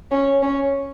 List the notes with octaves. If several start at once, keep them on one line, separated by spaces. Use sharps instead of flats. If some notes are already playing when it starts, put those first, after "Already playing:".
C#4
C#4